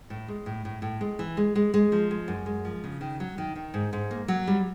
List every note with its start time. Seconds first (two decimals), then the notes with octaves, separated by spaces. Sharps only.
0.10 A2
0.28 G#3
0.46 A2
0.65 A2
0.82 A2
1.01 G#3
1.19 E3
1.37 G#3
1.55 G#3
1.74 G#3
1.92 F3
2.11 G#3
2.28 F#2
2.46 G#3
2.65 F3
2.84 C#3
3.01 D#3
3.20 F#3
3.38 D#3
3.56 D#3
3.74 G#2
3.93 G#2
4.11 A#3
4.28 F#3
4.47 G3